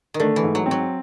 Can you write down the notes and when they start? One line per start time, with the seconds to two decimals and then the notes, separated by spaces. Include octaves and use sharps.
0.14 D#3
0.20 D3 A3
0.36 E3
0.43 G#2
0.55 F#3
0.66 C4
0.71 F#3